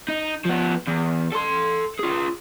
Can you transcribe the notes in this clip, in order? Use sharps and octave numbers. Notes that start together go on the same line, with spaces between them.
D#4
F3 B3
E2
A4 C6
F4 G#4